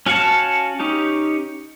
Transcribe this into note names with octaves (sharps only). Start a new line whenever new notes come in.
C#4 F#4 F5 F#5 A5
C#4 D#4 G4